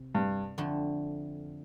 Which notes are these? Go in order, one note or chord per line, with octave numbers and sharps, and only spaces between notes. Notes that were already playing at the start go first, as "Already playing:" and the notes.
Already playing: C3
G2
F2 D3 A3